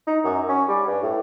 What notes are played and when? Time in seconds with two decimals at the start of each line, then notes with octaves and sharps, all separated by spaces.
0.07 D#4
0.25 F#2
0.49 C#4
0.68 G3
0.87 G2
1.03 A2